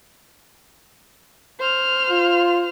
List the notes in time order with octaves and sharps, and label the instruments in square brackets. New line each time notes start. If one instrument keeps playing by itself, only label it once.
[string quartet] C5 F6
[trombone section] F4